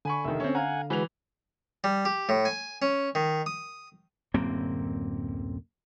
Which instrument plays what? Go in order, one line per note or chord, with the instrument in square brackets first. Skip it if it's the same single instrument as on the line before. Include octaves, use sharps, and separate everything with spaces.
[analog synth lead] D3 [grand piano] G#5 B5 C#6
[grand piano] F1 D#3 [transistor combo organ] E5
[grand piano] C4 C#4
[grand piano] F5 A#5 [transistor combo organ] F#5 G#5
[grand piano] E3 F7 [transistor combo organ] G#3 F#4 B4
[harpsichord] G3
G4
A2
G#5
C#4
D#3
D#6
[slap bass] D1 F#2 A#3 C4